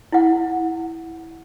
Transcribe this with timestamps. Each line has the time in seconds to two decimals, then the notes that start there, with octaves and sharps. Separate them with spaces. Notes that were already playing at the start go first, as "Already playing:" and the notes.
0.12 E4 F#5